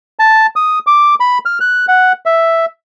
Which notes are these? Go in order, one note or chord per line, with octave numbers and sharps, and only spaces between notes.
A5
D#6
D6
B5
F6
F#6
F#5
E5